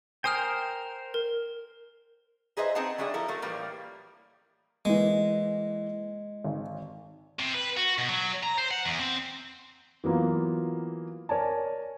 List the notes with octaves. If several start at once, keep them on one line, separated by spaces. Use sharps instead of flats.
A#4 C5 G5 G#5 D#6 F6
A#4
D#4 G#4 B4 C5 D#5 E5
C4 D#4 G#4 F#5 A5
F#3 G3 D4 G#4 E5
F3 E4 A4 A#4
F#3 A3 A#3
A2 E3 F3 G3 A#3
E3 G#3 A#3
G#1
C3
B4
F#4
B2
F#3
A#5
C5
F#5
E2
C4
E3 F#3 A#3 B3 F4
A#4 C#5 D5 G#5 A5